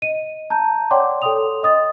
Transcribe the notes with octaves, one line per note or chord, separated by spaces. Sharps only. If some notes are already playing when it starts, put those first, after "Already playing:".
D#5 D#7
A5 A#5 G6
C#5 D5 F#5 G5 C6 D6
A4 C#5 G5 C6 D#6 F7
D#5 D#6 A6